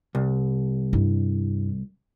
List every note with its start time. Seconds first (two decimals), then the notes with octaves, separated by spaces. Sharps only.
0.15 C2
0.93 G2 E4